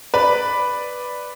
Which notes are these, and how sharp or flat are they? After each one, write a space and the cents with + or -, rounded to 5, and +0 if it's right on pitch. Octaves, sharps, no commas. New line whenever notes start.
B4 +0 D5 +0